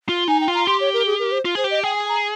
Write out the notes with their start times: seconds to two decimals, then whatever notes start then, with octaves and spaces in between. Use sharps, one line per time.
0.09 F4
0.28 D#4 G#5
0.41 G5
0.48 F4
0.54 A#5
0.67 G4 C6
0.80 C#5
0.93 A#4
1.06 G#4
1.19 A#4
1.31 C5
1.45 F4
1.55 G#4 C5
1.64 G4
1.71 D#5
1.84 G#4 G5
1.96 G#5
2.09 A#5